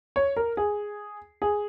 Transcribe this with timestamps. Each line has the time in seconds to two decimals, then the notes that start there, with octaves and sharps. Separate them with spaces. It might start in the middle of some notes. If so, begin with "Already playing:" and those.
0.16 C#5
0.37 A#4
0.57 G#4
1.42 G#4